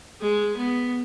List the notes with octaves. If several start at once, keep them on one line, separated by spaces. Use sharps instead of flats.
G#3
B3